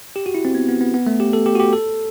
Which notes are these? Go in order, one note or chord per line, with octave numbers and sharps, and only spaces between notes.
G4
F#4
E4
C4
B3
B3
B3
B3
A3
G4
A4
G4
F#4
G4
A4